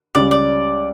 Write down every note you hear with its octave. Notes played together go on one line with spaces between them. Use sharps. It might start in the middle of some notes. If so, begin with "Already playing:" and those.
C#2 C#3 G3 C#4 D5
D5